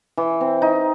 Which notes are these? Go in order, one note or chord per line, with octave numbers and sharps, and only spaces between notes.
E3
C4
D#4